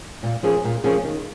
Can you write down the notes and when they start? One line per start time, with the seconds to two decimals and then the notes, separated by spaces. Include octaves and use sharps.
0.23 A#2
0.43 F3 A#3 C#4 G#4
0.64 A#2
0.84 F3 A#3 C#4 G#4
1.05 D#3